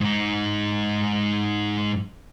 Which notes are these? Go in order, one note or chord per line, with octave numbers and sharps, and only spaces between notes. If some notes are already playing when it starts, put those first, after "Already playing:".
G#2 D#4